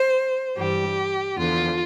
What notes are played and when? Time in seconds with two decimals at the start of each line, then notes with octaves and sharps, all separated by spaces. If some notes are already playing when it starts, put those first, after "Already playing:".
Already playing: C5
0.56 G2 E3 G3 G4
1.37 E2 D3 F3 F4